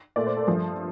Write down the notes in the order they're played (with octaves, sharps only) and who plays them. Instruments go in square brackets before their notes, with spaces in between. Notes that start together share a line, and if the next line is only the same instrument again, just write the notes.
[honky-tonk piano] A#2 A3 D5
C5
A4
G2 F3 A3